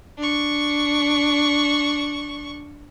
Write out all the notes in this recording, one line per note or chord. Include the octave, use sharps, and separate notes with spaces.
D4 C#6